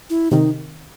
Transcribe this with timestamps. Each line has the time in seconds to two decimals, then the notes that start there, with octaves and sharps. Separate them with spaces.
0.10 E4
0.31 C3 D#3 D#4